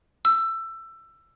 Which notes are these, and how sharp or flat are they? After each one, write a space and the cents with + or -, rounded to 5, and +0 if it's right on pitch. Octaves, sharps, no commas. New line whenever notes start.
E6 +15